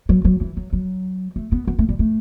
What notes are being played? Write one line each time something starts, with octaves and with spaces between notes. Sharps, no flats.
F#3
F#3
E3
F#3
F#3
A3
B3
B3
A3
G3
A3